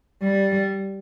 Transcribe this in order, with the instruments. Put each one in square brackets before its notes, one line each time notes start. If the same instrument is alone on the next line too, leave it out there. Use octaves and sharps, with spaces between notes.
[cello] G3